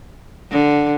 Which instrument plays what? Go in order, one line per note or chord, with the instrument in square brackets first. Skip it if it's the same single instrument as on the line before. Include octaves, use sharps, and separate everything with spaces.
[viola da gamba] D3